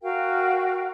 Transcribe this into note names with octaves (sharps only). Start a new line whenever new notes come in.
F#4 A#4 F5 G5